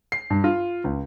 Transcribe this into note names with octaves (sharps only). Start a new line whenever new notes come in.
C7
G2
F4
C#2